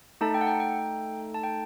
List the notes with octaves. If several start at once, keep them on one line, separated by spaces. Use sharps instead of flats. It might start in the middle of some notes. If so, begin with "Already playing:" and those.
A3 D#4 A4 A5
G5
F#5
G5
G5
A5
G5